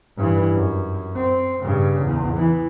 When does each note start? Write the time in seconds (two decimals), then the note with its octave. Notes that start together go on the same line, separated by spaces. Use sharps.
0.17 G2 E3
0.54 F#2
1.16 C4
1.62 G2 C#3
2.03 E2
2.36 E3